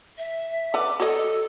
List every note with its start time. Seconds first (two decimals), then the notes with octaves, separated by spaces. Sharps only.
0.18 E5
0.74 A4 B4 D6
1.00 F#4 A4 C#5 D#5